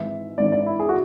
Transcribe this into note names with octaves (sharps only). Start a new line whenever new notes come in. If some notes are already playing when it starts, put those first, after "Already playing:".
Already playing: G#1 G#2 E3 E5
G#1 G#2 E3 D5
D5
E4
G#4
F#4